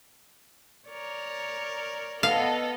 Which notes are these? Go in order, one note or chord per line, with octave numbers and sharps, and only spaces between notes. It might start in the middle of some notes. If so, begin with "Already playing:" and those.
A#4 C#5 D5
B3 A4 D#5 F5